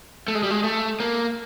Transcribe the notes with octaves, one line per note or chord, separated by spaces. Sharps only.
A3
G#3
G3
G#3
A3
A#3